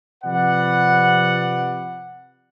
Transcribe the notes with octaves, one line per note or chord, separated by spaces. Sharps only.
C3 F3 B4 D5 F#5